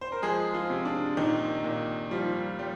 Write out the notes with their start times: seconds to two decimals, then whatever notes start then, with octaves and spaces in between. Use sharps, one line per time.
0.01 C5
0.12 A#4
0.22 F3 G#3 G#4
0.54 F3 F4
0.70 C3
0.85 D4
1.17 A#2 D#3 D#4
1.64 A#2
2.11 F3 G3 F4
2.59 G3 G4